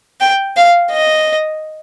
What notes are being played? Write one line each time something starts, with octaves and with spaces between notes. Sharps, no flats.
G5
F5
D#5